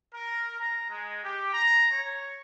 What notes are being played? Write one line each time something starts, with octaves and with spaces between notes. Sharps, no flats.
A#4
A#5
G#3
G4
A#5
C#5